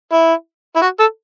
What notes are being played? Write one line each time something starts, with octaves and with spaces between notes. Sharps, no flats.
E4
E4
F#4
A4